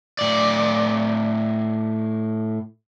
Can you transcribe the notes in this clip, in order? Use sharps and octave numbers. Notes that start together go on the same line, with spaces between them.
A2 D5